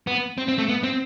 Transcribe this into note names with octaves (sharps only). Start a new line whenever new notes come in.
B3
C4
C4
A3
B3
C4